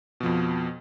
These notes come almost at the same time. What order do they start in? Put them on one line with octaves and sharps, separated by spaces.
B2 F3 F2